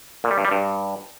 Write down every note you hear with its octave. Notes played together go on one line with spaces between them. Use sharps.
A#2
G3
G2
G3
G2